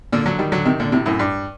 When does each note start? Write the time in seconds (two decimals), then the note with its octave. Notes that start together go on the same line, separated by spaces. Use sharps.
0.13 A#2 D3
0.26 D3 F#3
0.39 D#3 G3
0.52 D3 F#3
0.65 C3 D#3
0.80 A#2 D3
0.92 A2 C3
1.06 F#2 A2
1.19 G2